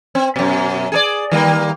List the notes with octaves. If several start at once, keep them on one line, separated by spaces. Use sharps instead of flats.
C4
F#2 B2
G#4 A4 D5
D#3 G3 A#3